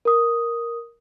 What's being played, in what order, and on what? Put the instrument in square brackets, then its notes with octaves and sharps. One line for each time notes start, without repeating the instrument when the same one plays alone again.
[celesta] A#4 D#6